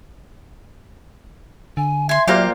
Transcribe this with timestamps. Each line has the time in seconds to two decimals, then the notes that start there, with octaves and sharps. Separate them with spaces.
1.77 D3 G#5
2.09 E5 G#5 C6
2.27 A#2 F#3 F4 G4 C5 F5 A#5